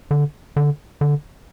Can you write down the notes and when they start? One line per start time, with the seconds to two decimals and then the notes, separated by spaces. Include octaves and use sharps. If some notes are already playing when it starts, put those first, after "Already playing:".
0.11 D3
0.56 D3
1.01 D3